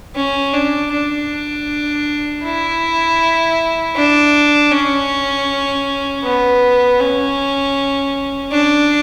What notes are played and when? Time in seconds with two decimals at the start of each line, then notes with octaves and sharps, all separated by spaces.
0.16 C#4
0.54 D4
0.92 D4
2.44 E4
3.96 D4
4.71 C#4
6.23 B3
7.00 C#4
8.51 D4